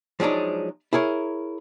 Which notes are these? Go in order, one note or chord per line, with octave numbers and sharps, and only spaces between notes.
F3 F#3 G#3 D4 D#4
E4 G#4 A#4 C#5